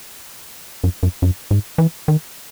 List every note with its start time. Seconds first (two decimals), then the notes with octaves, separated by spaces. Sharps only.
0.84 F#2
1.03 F#2
1.22 F#2
1.51 G#2
1.78 E3
2.08 D#3